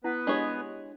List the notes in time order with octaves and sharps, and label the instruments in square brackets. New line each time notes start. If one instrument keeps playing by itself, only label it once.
[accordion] B3 B4 [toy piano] E4 F#5
[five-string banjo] G#3 C#5 D#5 [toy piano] D4 G4